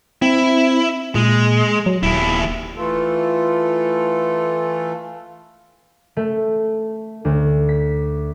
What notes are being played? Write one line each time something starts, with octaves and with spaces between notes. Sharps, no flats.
C4 E4
A#2 G#3
F#3
D#1 D#2 E4
E3 A3 F4 A4
A3
D2
B6